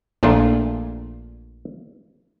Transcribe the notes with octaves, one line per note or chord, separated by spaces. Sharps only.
A#1 A#2 A3 D4 F4